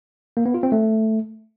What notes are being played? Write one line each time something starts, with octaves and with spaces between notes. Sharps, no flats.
A#3
B3
F4
C4
A3